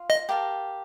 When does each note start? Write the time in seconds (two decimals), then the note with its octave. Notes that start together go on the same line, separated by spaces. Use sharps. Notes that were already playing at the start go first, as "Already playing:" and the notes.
Already playing: F4 F5
0.10 D#5
0.29 G4 A#4 F5 A5